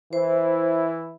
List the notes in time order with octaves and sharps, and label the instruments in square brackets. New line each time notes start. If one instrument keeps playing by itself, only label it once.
[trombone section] E3 E4 [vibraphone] C5